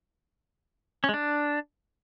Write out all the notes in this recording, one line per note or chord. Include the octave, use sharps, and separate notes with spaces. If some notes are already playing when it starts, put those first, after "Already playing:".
C#4
G#3
D4